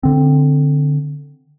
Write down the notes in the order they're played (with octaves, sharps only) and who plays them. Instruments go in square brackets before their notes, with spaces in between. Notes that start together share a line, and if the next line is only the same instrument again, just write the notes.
[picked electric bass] D3 C4